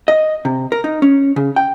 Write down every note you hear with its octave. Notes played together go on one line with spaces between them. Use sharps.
D#5
C3
A#4
D#4
C#4
C#3
G5